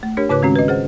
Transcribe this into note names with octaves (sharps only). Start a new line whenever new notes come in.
A3
D4 G4 A#4 C#5
G#2 C#3 B4 C#5 D6 F#6
D#3 G#3 C4 C#4 F#4
B4 D#5
G#4 C5 F#5